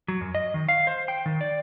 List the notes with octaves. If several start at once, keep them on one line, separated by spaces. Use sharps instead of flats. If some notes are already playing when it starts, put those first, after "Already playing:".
F#3
F#2
D#5
D#3
F5
C5
G5
D#3
D5